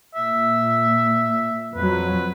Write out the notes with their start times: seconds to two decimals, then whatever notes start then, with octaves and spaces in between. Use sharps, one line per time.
0.15 A#2 E5
1.75 F2 F#3 B4